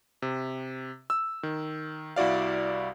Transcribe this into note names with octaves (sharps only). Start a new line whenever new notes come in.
C3
E6
D#3
C2 E4 F#4 D5 F5